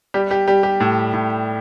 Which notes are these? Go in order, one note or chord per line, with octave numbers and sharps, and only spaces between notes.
G3 G4
G4
G3 G4
G4
A2
A2